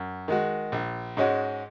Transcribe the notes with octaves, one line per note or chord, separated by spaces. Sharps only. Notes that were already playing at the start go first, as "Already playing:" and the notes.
Already playing: F#2
D#3 G#3 F#4
A#1
G#2 G#3 C#4 F#4